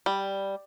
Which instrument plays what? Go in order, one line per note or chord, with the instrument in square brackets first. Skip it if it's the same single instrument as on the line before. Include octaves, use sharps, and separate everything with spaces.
[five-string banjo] G3